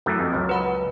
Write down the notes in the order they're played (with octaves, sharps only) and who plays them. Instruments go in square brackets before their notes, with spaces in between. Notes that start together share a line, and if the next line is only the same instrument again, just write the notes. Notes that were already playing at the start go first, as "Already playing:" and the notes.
[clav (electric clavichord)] F#2 E3 A3
F2
C#2 F#2
[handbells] B4 F#5 B5